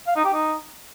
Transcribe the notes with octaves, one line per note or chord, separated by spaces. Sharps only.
F5
D#4
G4
D#4